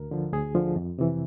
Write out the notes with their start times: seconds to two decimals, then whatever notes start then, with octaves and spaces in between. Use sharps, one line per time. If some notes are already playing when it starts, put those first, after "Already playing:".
Already playing: D2 A#4
0.11 D3 F3
0.32 D2 G#4
0.55 D3 F3
0.76 F2
0.99 C3 E3